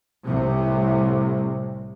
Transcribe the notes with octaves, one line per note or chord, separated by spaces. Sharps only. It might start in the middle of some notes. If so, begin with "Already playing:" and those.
C2 A2 C3